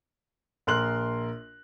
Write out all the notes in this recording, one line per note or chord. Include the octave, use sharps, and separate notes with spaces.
A#1 A#4 C6 F#6 F#7